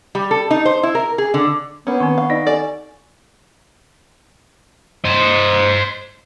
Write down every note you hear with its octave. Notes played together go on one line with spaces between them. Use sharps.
G3
A4
D#4
C5
E4
A#4
G#4
D3
A#3 B3 C#4 D4 B4
D#3 C4 C#6
F5 F#5 C#6
D#4 D5 D#5 D7
G4 A4 D5 G#5
C5 D#5